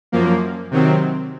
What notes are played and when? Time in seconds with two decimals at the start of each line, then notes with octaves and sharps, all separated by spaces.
0.12 F#2 F3 A#3
0.71 C3 D#3 F#3 C4